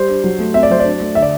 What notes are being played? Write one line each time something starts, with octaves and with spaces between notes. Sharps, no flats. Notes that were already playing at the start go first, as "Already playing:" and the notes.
Already playing: G3 C5
D4
F#3
A3
C4 E5
D5
F#3 C5
D4 D5
A3
D3 E5
D5